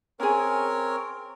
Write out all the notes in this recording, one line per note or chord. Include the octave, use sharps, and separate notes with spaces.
C4 C#4 G#4 A#4 C#5